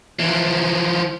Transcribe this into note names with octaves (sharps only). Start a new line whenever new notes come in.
E3 F3